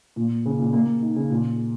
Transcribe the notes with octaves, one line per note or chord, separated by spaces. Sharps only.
A#2
C#3
A#2
A#3
D#4
C#3
A#2